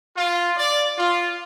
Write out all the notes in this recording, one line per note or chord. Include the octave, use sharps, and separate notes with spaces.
F4
D5
F4